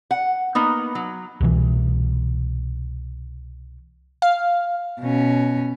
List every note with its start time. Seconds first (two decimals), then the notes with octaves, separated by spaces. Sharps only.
0.11 F#5
0.55 A#3 B3 D#4
0.95 F#3
1.41 C2 B2 E3
4.22 F5
5.01 B2 C#4